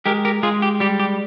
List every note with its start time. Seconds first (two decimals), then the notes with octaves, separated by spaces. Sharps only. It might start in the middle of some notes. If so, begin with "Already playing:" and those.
0.06 G#3 G4 A#4
0.25 G4 A#4
0.43 G#3 F4 G#4
0.62 G4
0.80 G3 G4
1.00 G4